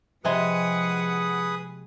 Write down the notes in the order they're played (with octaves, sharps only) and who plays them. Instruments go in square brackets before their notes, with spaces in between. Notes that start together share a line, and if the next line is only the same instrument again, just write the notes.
[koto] C3 G#3 G#5 [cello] F3 F#5 [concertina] G#4 B4 D#6